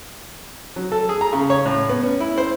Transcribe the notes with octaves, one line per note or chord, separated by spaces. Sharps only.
F#3
A4
G#4
A#5
C#3
C#5
A2
B3
C#4
E4
C5